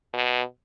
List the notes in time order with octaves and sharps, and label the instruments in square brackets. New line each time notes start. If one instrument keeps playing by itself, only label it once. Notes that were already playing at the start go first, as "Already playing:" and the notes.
[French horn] B2